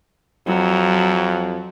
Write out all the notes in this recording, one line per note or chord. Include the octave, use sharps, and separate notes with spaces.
F2 F#3